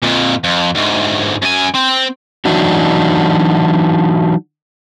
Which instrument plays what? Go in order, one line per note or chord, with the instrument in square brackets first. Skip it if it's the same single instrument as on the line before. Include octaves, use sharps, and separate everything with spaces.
[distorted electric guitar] F2 A#2
F2
D2 G#2
F#2 G#5
C4
[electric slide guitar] E3 F#3 D4 D#4 F#4